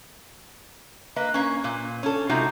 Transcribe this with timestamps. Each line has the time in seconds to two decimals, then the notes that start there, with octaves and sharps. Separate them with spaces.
1.16 A#3 B4 D#5
1.34 A#3 C#4
1.64 A#2
2.03 C#4 A4
2.29 C3 G#3 D#4 F4 F#4